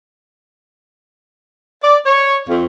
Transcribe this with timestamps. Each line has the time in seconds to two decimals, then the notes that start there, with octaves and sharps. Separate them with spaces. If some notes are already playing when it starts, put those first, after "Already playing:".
1.83 D5
2.06 C#5
2.48 F2